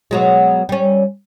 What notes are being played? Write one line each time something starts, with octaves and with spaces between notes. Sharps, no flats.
B2 F#3 G#3
G3 C#4